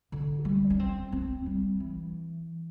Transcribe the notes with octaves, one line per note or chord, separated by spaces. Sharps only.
D3
G3
D4
C4
C4
G3
E3